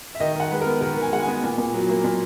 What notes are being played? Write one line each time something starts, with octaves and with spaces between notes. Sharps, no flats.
E5
D#3 D#5
D#3 F#5
G#3 B4
B3 A#4
D#3 A#4
D#3
G#5
G#3 F#5
G#5
B3
A#2
A#2
F#3
A#3
A#2